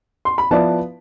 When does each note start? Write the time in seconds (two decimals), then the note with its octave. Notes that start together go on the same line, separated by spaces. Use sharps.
0.25 C6
0.38 B5
0.51 F3 B3 E4 B4 D5 A5